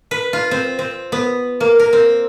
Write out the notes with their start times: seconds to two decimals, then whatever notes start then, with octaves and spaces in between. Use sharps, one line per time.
0.11 B4
0.33 F4
0.51 C4
0.79 C4
1.12 B3
1.60 A#3
1.80 A#4
1.93 C4